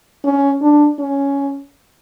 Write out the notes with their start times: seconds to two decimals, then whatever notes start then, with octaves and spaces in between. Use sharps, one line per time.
0.25 C#4
0.62 D4
0.99 C#4